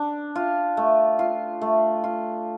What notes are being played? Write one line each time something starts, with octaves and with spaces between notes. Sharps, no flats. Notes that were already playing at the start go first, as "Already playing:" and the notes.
Already playing: D4
F4
A3
F4
A3
F4